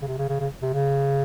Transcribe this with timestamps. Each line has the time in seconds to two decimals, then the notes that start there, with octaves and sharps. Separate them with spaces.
0.02 C#3
0.07 C3
0.18 C#3
0.29 C#3
0.40 C#3
0.62 C3
0.73 C#3